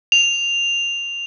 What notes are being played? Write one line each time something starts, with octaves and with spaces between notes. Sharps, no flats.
F7